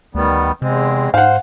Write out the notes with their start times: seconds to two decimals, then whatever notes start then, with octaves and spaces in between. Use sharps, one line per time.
0.15 D2 D#3 G3 B3
0.62 E2 C3 G#3 C4
1.14 G#2 C5 F5 F#5